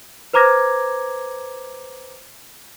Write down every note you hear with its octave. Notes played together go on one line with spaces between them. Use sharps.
B4 C5 A#5 D6 G#6 A#6